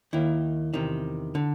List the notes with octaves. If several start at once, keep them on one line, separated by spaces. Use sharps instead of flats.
D#2 D#3 E4
E2 C3 D#3
D3